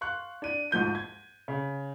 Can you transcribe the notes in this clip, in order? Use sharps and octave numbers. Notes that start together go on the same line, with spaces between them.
F5 C6 C#6 F#6
D4 D#7
D2 G#2 F3 G6 D#7
G#6
C#3